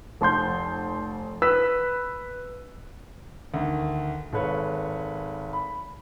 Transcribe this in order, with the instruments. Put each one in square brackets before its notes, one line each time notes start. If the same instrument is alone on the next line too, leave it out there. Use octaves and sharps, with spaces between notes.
[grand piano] F1 A5 C6 G6
B4 E6 B6
D2 D#3
G#1 A4 B4 C#5 F5
B5